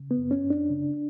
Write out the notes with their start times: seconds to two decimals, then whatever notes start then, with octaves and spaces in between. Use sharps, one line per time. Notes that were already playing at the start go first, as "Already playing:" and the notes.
Already playing: C#3
0.11 B3
0.18 F#2
0.31 C#4
0.44 F#2
0.50 D4
0.70 C#3